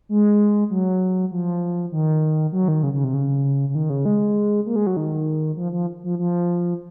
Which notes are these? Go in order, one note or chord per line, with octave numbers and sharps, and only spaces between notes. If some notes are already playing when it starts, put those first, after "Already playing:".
G#3
F#3
F3
D#3
F#3
D#3
C#3
C#3
C3
C#3
C#3
D#3
C#3
G#3
A#3
G#3
F#3
D#3
F3
F3
F3
F3